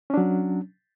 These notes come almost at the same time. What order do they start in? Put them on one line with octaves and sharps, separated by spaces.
C#4 D4 F#3